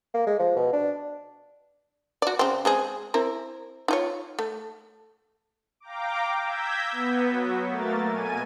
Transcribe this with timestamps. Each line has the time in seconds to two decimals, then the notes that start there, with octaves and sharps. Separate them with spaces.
0.14 A#3
0.27 G#3
0.39 F3
0.56 B2
0.73 D4
2.22 F#4 D5
2.39 C#3 C4
2.65 G#3 C4 G#4
3.14 C4 E4 A#4
3.88 D#4 F4 C#5
4.39 A3
5.80 F5 G5 A#5 D6
6.41 E6 G6 G#6 A#6 B6
6.92 B3
7.28 F#3 F#4
7.67 A3 A#3 A#4 A6
8.08 B2 G#5 D#7